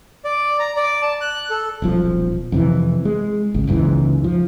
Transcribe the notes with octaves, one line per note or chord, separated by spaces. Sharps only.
D5
A#5
D5
A5
F#6
A4
D#1 B1 F3
F2 C3 E3
G#3
G#1 C#2
F#1 C#2 G#2 E3
F3